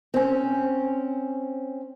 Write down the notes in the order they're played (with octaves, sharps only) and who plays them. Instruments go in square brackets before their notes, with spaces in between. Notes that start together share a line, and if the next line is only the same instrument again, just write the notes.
[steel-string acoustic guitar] C4 C#4